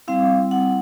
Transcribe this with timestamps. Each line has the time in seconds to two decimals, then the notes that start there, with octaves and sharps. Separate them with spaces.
0.08 G3 C4 E4 F5
0.51 F#5